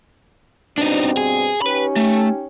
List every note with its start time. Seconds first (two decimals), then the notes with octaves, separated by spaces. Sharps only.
0.78 G2 B2 C4 D4 D#4
1.17 G#4
1.62 C#4 D#4 G4 B4 B5
1.96 A3